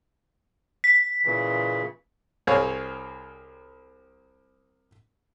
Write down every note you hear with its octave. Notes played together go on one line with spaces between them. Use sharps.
B6
A#2 C#3 E3
C2 C4 G#4 C#5 F5